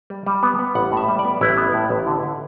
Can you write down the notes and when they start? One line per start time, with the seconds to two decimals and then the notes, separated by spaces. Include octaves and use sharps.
0.10 G3
0.26 G3
0.43 B3
0.59 B3
0.75 A1 F#5
0.92 A2
0.97 E5
1.08 G3
1.19 D5
1.25 B3
1.41 A1 E4
1.58 B3
1.74 A2
1.90 A1
2.07 D3
2.23 D3